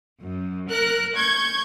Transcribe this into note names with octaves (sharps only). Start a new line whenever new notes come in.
F#2
A#4 F#6
C#6 G6 G#6